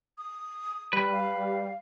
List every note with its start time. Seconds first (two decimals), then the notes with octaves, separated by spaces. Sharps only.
0.18 D#6
0.93 G3 B4
1.12 F5